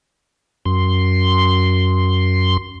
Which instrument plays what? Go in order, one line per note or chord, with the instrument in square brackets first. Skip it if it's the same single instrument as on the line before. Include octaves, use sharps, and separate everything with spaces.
[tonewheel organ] F#2 C6